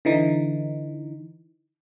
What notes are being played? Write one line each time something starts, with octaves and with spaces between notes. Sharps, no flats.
D3 E3 D#4